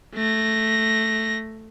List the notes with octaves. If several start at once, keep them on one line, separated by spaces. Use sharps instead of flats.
A3 A#6